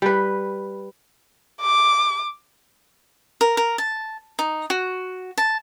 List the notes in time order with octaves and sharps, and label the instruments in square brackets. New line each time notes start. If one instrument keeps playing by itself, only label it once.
[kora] G3 B4
[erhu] D6
[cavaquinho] A#4
A#4
A5
D#4
F#4
A5